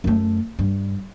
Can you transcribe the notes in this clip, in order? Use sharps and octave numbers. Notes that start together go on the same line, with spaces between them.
F#2 A3
G2